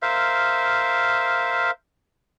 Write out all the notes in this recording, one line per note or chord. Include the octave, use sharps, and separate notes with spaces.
A#4 C5 E5 F5